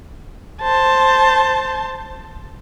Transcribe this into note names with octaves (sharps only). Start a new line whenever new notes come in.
C5 A5